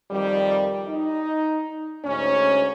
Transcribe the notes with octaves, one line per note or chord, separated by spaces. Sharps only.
F2 D#3 G3
D#4
D2 G#2 C#4